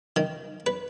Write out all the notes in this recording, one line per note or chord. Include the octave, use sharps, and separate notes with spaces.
D#3
B4